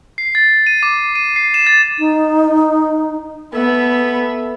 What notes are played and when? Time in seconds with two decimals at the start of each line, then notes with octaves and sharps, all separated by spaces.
0.18 C7
0.35 A6
0.67 D#7
0.83 D6
1.15 D#7
1.36 C7
1.54 E7
1.67 A6
1.99 D#4
3.54 B3 A4 E5 B5